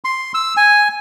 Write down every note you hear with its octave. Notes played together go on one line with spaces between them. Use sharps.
C6
E6
G#5